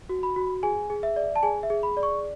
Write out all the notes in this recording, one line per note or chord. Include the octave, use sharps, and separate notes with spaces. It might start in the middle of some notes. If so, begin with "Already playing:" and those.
F#4
B5
F#4
G#4 G#5
G#4
E5
D5
A5
G#4 G#5
E5
G#4
B5
D5
C#6